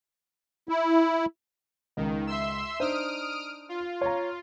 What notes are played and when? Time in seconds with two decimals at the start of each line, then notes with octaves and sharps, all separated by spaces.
0.69 E4
1.97 C#2 D#3
2.27 E5 C6 E6
2.80 D4 D#4 C5 D#6 F6 D7
3.69 F4
4.01 C#5 A#5